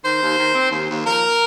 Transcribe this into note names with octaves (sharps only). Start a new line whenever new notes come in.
D#3 C5
D#2
D#3
C4
D#2
D#2
F3 A#4